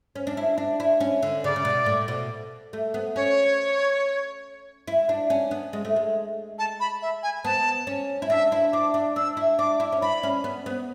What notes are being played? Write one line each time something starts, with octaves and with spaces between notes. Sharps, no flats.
C#4
D4
E4
D4
E4
C#4
D3
C#3 D5
C#3
B2
A2
B2
A3
B3
C#4 C#5
E4
D4
C#4
B3
G#3
A3
G#3
A5
B5
E5
G#5
B3 A5
C#4
E4
D4 E5
E4
D4 D6
D4
D4 E6
E4
D4 D6
E4
C#4
D4 B5
C#4
B3
B3